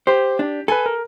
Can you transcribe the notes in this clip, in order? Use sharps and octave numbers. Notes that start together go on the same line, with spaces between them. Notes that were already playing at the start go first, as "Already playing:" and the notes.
G4 C5
D4
A4 B4 G#5
A#4